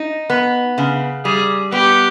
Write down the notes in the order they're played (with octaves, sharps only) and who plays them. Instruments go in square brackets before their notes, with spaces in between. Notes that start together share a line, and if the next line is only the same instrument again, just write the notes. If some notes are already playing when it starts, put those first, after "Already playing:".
Already playing: [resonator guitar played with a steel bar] D#4
B3
C#3
[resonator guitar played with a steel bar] G3 [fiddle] G#4
[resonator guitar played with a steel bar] B3 [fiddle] G4